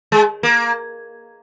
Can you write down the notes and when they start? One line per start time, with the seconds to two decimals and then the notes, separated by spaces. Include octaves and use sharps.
0.12 G#3
0.43 A#3